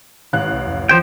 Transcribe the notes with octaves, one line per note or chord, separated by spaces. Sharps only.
A1 G#2 D#3 F5 F#6
C2
C2 F2
D#2 E3 F3 C5 G5